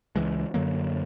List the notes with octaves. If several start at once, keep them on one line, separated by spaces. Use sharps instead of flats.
C#2 E3 G#3
F#2 D3 F#3 A#3